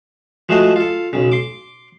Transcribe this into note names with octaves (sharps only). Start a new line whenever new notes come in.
F3 G#3 A3 F#4 C5 D#5
F4 A4
B1 C#3
C6 D6